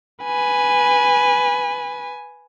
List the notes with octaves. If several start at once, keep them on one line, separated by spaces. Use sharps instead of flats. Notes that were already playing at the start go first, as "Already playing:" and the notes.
B4 G#5